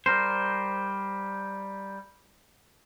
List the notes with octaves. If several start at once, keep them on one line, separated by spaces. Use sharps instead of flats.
G3 A#4 C5